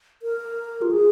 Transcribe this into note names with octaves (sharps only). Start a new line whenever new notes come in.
A#4
F4
G#4